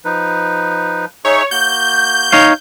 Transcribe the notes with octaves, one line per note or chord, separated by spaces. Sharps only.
F3 D#4 B4
D#4 G#4 C#5 E5
A#3 F#4 G6
D#4 C#5 F5